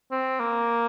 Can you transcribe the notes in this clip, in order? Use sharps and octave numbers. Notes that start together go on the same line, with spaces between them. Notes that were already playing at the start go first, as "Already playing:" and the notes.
C4
A#3